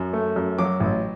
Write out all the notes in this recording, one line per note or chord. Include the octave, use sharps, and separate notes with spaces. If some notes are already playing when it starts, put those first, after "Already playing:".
Already playing: F#2
A3
F#2
F#3 D6
A1